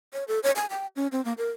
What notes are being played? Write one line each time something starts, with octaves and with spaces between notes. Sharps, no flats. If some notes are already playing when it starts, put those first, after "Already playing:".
C#5
A4
C#5
G#5
G5
C#4
C4
A#3
A#4